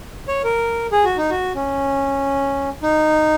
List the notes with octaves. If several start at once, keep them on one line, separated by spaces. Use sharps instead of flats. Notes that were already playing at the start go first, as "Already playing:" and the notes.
C#5
A#4
G#4
F#4
D#4
F#4
C#4
D#4